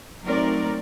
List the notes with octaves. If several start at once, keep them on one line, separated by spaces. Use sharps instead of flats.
F#3 A3 C4 D#4 A#4 D5